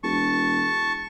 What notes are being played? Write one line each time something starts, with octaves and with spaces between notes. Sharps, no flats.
E1 A5 C#6